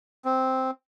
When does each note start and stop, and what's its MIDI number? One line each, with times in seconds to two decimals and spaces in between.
0.25 0.71 60